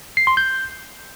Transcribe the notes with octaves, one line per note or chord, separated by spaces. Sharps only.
C7
C6
G6